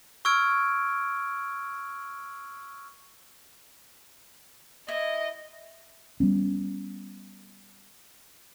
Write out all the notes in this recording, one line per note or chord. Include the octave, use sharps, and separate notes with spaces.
C#6 E6 F6 G#6 D7
E4 D#5
G3 B3 C#4